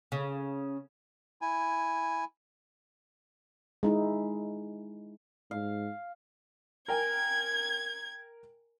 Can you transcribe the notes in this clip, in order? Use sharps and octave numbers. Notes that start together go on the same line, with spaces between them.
C#3
E4 G#5
G#3 D#4 E4
G#2 F5
A#4 G5 G#5 G#6